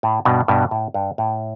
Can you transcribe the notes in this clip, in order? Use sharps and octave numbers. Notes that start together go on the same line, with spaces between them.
A2
G2 B2
G2 B2
A2
G2
A2